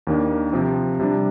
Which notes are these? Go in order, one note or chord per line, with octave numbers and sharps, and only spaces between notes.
D#2 D#3 A#3 D4
C3 F3 C4
C3 G3 D4